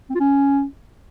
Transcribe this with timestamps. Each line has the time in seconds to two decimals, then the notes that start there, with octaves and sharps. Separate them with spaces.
0.10 C4
0.15 F4
0.20 C#4